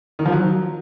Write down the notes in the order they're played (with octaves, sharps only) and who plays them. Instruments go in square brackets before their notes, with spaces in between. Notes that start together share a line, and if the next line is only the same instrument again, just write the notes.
[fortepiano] D#3
F3
F#3